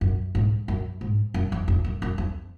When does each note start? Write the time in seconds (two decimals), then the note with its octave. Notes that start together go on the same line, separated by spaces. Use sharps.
0.01 F#2
0.35 G#2
0.68 F#2
1.01 G#2
1.34 F#2
1.52 F2
1.68 F2
1.84 F#2
2.02 F#2
2.18 F2